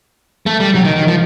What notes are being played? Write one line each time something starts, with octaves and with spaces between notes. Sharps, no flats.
A3
G3
F#3
D#3
D#3
F3